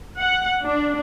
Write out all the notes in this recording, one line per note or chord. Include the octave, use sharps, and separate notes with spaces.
F#5
D4